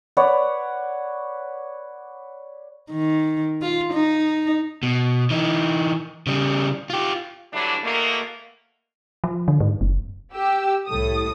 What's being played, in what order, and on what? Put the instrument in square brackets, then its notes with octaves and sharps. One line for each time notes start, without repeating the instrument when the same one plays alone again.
[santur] B4 C#5 D5 F#5
[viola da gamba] D#3
F4
D#4
[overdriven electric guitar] B2
E3 D#4
C#3 G3
F4 G4
[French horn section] D3 E3 F#3 G3 A3 D4
E2 B2 A3 A#3
[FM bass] F3
D3
G#2
F#1
[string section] G4 E6
C2 A2 A4 D#6